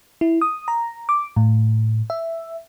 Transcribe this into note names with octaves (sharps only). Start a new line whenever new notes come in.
E4
D#6
A#5
D6
A2
E5